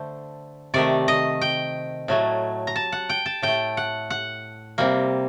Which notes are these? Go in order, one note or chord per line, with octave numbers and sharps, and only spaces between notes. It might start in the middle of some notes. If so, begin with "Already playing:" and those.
Already playing: D3 A3 C5
C3 D#3 A3 D5
D#5
G5
A2 F#3 A3
A#5
A5
F#5
G5
A5
A2 A3 G5
F#5
F#5
C3 G3 A#3